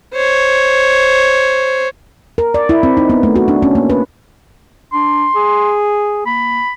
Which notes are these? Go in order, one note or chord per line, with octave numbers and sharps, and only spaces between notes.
C5 C#5
A#4
D5
E4
C4
D#4
B3
A3
F#4
D4
C#4
A#3
B4
D4 C6
G#4
A#3 B5